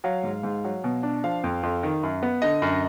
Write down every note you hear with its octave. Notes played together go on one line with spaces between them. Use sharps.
F#3 F5
G#2
G#2
F#3
B2
D4
F3 F5
F2
F2
D#3
F#2
B3
D3 D#5
F#2